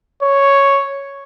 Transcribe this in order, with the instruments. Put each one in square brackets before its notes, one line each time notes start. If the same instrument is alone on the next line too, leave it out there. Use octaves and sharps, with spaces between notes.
[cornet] C#5